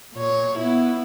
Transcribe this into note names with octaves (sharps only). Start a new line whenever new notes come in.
A#2 C#5
B3 E4